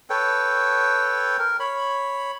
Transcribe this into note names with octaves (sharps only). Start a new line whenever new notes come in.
A4 B4 C#5 G5
A#4
C#5 B5